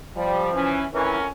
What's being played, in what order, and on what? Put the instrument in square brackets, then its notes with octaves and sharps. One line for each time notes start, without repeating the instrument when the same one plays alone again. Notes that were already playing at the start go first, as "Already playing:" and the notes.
[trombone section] F3 [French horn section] G3
[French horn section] E3 [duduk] C#4
[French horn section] F2 A2 C#4 [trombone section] E3 [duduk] A#4